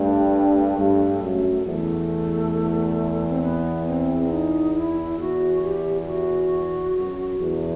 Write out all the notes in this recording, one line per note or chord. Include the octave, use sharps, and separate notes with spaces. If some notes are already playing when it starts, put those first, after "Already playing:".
Already playing: G2 A3
G2
F#2
E2 A3
C4
B3
C4
C4
D#4
E4
E2 F#4
G4
G4
F#4
F#2
E2